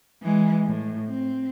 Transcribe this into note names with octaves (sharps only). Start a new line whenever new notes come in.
E3 G#3
A2
C4